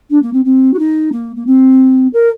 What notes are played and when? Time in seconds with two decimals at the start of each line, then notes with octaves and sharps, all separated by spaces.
0.10 D4
0.23 A#3
0.33 C4
0.45 C4
0.74 F#4
0.79 D#4
1.12 A#3
1.36 A#3
1.47 C4
2.14 A#4